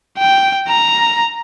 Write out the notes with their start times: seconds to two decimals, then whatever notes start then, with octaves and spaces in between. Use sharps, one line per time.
0.19 G5
0.68 A#5